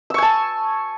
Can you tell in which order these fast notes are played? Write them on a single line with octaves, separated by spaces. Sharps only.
E6 C#6 G#5 A5